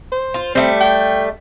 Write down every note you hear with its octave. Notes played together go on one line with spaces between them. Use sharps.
C5
F4
G3 A3 C4
G5